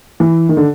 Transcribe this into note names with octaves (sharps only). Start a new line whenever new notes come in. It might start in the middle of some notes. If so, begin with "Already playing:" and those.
E3
D#3
D3